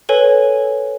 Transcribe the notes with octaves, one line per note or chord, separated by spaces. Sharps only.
A4 B4 C#5 G#5